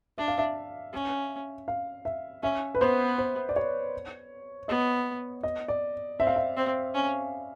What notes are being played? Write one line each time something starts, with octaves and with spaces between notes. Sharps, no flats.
D4 E5
F5
E5
C#4
F5
E5
C#4 E5
B4
B3 C5
C5
D5
C#5
B3 D#5
D#5
D5
C4 E5
F5
E5
C4
C#4